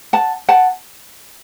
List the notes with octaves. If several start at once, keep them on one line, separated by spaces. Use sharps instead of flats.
F#5 A5
F#5 A5